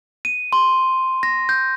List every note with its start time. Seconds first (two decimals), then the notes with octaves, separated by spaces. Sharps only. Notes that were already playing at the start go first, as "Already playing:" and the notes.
0.25 D#7
0.53 C6
1.23 A#6
1.49 G6